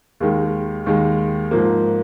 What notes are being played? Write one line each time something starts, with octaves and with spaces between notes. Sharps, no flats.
D#2 D#3 G#3
D#2 D#3 G#3
G#2 F3 A#3